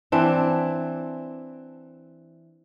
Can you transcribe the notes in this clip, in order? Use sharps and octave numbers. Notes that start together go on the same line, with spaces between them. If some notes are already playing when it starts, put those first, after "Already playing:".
E3 C4 D4